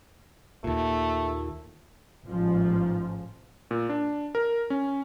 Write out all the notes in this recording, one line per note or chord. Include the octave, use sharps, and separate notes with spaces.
D#2 A#2 A3
A1 G#2 F3
A#2
D4
A#4
C#4